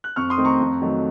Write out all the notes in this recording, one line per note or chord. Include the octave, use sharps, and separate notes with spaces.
F#6
F2 C#6 F6
C6 D#6
D#3 A3 C4
A#5 C#6
F2
D#3 F#3 A3